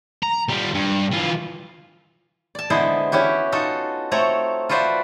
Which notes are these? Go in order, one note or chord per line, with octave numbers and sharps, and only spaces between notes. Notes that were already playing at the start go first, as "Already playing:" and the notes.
A#5
G3 F4
G2
E3 F4
D5 A5
D3 G#3 B3 E4 C5
C#4 E4 F#4 G4
D#4 F4 F#4 A4
A3 C4 A4 C#5 A#5
F4 F#4 B4 C5 D5 E5